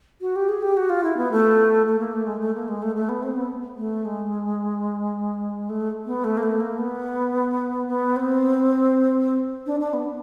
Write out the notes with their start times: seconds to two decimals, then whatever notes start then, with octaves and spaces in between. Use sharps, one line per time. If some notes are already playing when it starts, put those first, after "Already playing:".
0.21 F#4
0.36 G4
0.49 G#4
0.62 G4
0.77 F#4
0.90 F4
1.04 E4
1.17 B3
1.32 A3
1.86 A3
1.99 A#3
2.13 A3
2.27 G#3
2.40 A3
2.55 A#3
2.68 G#3
2.82 A3
2.96 A3
3.09 B3
3.23 C4
3.36 B3
3.77 A3
4.05 G#3
5.70 A3
6.06 B3
6.24 A3
6.37 A#3
6.43 A3
6.60 A#3
6.78 B3
7.88 B3
8.16 C4
9.66 D4
9.80 D4
9.93 B3